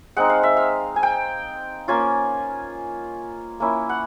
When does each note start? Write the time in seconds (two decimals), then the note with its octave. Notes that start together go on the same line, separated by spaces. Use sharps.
0.17 G#3 C4 D#4 F#5
0.30 F5
0.43 E5
0.57 F5
0.96 G#5
1.03 G5
1.88 A#3 C#4 F4 G#5
3.60 A#3 C#4 E4
3.89 F#5